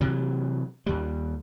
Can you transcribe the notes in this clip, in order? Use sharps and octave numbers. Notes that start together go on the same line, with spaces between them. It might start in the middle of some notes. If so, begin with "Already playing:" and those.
C3 E3 F#3
D#2 G3